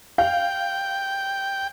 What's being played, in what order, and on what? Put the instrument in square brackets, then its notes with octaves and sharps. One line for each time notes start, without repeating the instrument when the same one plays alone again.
[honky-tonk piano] F5 [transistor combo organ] G5